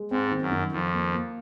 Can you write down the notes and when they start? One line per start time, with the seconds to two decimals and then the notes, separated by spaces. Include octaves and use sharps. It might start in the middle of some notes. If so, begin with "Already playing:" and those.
Already playing: G#3
0.11 G#2 C4
0.31 D#3
0.41 F#2
0.52 D#3
0.72 F2 D#3
0.93 A#3
1.13 A#3